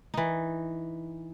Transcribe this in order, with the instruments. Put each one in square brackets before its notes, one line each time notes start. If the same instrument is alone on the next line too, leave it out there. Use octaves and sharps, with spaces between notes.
[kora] E3 D#4